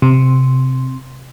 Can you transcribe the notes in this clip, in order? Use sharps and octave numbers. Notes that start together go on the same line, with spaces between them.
C3